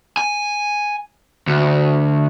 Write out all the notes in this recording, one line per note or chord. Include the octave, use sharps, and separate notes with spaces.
G#5
D2